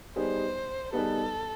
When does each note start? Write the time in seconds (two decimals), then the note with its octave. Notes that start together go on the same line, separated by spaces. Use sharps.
0.16 G3 B3 D#4 G#4 B4 C5
0.92 G3 B3 D#4 G#4 A4 B4